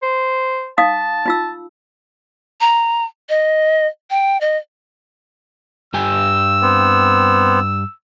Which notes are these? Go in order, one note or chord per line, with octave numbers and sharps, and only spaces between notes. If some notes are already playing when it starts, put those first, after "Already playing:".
C5
D#4 F5 A5 D#6
D#4 F4 E6
A#5
D#5
G5
D#5
G2 G4 G#5 E6
B3 C4